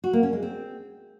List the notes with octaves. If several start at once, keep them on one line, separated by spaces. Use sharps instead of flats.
F#4
A#3
C#4
G#3
C4